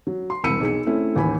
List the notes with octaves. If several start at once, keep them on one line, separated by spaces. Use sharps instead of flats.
F#3
C6
E1 C2 B5 E6 C#7 D#7
B1 G#4 C#7
A3 C4 C#4 E4
A1 D#2 G#5 B5